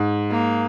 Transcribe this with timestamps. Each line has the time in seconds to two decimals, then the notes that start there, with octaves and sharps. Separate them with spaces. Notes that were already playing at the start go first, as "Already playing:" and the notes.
Already playing: G#2
0.31 A#3